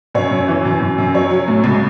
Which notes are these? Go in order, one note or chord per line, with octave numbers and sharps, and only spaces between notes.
F#2 C#5
F#2
E3
F#2
F#2
F#2
F#3 C#5
F#3
A2
C#2